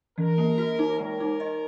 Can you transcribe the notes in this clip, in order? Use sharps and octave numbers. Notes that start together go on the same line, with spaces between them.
E3 A#4
A#3
F#4
D#4
G#3 A#4
D#4
D#5